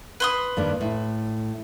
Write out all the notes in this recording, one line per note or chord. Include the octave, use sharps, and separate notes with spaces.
B4 C6 D#6
G2 D#3 A#3
A2